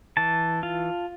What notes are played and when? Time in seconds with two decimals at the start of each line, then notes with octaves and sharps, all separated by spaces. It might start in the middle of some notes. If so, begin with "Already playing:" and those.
0.17 E3 A5
0.63 F4